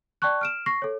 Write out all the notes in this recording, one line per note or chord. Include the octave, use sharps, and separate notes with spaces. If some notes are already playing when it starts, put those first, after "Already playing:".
D5 G5 A5 C#6 F#6
F6 D7 E7
C#6 A#6 C7
A4 C#5